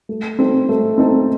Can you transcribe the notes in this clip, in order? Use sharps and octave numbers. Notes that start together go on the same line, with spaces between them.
A3
C4 D#4 A4
A3
C4 D#4 A4